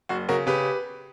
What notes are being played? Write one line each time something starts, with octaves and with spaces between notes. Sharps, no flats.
F#1 F#4
C#3 F#4 A#4
C#3 G4 B4